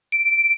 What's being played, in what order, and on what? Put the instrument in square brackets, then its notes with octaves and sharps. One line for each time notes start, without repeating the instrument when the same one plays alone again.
[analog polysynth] D7